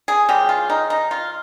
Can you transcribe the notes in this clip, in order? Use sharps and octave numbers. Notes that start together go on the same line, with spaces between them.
G#4
C#3 F3 G#3 G4
F4
D#4
D#4
F4